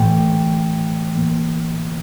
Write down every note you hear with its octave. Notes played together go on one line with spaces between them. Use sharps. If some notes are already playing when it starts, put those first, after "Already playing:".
Already playing: A2 E3 A3 G5
A2 E3 A#3